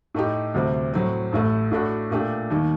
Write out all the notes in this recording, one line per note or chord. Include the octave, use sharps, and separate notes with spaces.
A2 A3 D#4 G4
D2 C3 G3 C4
A2 F#3 C4
A1 A2 A3
A2 A3 D4 F#4
A#2 A3 D4 G4
D#2 D#3 G3